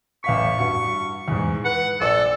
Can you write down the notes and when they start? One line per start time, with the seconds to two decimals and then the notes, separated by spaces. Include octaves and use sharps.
0.24 A1 F5 C#6 B6
0.59 G2 F#4 C#7
1.28 E2 G#2
1.65 B4 F#5
2.01 A#1 A4 D5